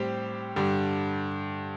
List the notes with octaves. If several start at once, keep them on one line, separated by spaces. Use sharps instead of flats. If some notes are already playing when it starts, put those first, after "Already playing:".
Already playing: A2 G3 C4 G4 C5
G2 D3 G3